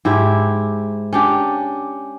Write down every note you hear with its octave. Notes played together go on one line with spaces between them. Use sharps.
G#2 E4 G4
C#4 D4 G4